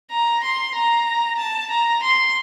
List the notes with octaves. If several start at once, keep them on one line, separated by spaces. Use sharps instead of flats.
A#5
C6
A#5
A5
A#5
C6